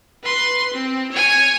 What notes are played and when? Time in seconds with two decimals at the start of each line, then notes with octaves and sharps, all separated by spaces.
0.24 B4 C6
0.74 C4
1.12 C#5 G#5